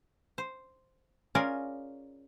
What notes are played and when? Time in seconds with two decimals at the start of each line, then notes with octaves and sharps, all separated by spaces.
0.38 C5
1.35 C#4 F4 G#4 A#4 C#5 D5